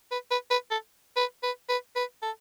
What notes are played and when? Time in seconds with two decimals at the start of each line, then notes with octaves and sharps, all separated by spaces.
0.11 B4
0.31 B4
0.51 B4
0.71 A4
1.16 B4
1.43 B4
1.69 B4
1.96 B4
2.22 A4